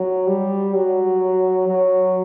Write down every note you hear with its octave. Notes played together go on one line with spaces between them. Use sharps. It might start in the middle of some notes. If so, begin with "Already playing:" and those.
Already playing: F#3
G3
F#3
F#3